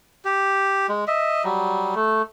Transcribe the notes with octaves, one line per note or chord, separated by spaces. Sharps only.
G4
G#3
D#5 E5
F#3 G3
A3